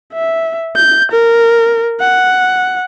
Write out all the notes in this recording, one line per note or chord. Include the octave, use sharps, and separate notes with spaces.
E5
G6
A#4
F#5